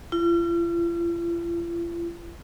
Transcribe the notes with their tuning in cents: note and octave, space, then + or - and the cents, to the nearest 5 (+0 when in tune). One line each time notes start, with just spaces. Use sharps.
F4 -45